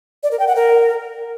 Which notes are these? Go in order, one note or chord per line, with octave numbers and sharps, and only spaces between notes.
D5
A#4
G5
F#5
A#4